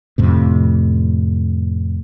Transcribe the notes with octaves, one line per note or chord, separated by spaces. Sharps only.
F2 A2 C3